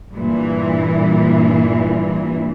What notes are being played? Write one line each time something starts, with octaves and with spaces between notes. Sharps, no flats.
G2 A#2 E3